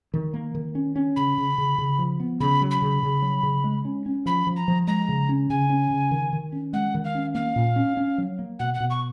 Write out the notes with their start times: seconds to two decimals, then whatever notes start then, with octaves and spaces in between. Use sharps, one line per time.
0.14 D#3
0.34 A#3
0.55 D#3
0.75 C#4
0.96 C#4
1.16 C#3 B5
1.38 C#3
1.58 C#3
1.78 C#3
1.99 F3
2.20 B3
2.40 C#3 B5
2.61 F#3
2.71 B5
2.82 C#3
3.03 C#3
3.22 F#3
3.43 C#3
3.64 G#3
3.85 C#4
4.06 C#4
4.26 F3 B5
4.47 F3
4.57 A#5
4.68 F3
4.87 G#3 A#5
5.09 C#3
5.29 C#4
5.50 C#3 G#5
5.70 C#4
5.91 C#3
6.11 D#3
6.33 D#3
6.52 C#4
6.73 G#3 F#5
6.95 D#3
7.04 F5
7.15 C#4
7.35 A#3 F5
7.56 A#2
7.76 C#4
7.97 C#4
8.18 F#3
8.39 A#3
8.59 B2 F#5
8.74 F#5
8.80 B2
8.90 C#6